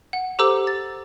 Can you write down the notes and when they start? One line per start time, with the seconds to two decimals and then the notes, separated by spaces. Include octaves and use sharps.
0.13 F#5
0.39 G4 A4 C5 A#5 D6 E6
0.67 A6